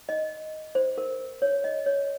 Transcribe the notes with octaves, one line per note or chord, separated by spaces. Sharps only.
D#5
C5
A#4
C#5
D#5
C#5